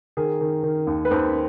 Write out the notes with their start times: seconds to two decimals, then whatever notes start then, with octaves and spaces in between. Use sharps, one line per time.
0.17 D#3 G#4 A#4
0.41 D#3
0.63 D#3
0.87 D#2
1.05 B4
1.11 D#2 A#4 C5